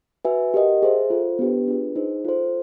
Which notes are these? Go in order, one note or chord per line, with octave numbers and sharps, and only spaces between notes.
F#4 B4 E5 G#5
G4 A#4 D#5 F#5
G#4 C5 E5
F4 A4 C5
B3 D4 G4 B4
D4 F4 G#4 B4
D#4 G#4 C5
F4 A4 C5